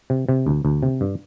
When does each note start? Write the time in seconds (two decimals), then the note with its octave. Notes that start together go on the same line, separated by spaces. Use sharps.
0.10 C3
0.29 C3
0.47 D2
0.65 D2
0.83 C3
1.01 G2